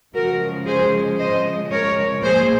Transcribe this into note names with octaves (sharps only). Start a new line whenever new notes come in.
C#3 F3 G#3 F#4 A#4
G#4 C5
C5 D#5
A#4 C#5
A#2 F3 G#3 G#4 C5